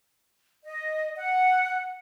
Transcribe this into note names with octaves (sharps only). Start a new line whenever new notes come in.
D#5
F#5